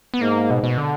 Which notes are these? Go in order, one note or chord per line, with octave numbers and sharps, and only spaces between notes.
B3
G#2 A#3
B2
B2
D3